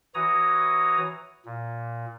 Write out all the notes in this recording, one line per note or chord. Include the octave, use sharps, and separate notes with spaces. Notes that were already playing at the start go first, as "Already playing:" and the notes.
E3 F#4 C#5 A#5 D#6
A#2